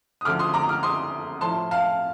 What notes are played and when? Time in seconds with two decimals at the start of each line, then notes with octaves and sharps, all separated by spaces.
0.21 D#6
0.25 D2 D3 F3 D6 F6
0.39 C6 D#6
0.54 A#5 D6
0.69 D6 F6
0.83 C6 D#6
1.41 A2 F3 A5 C6
1.71 F5 A5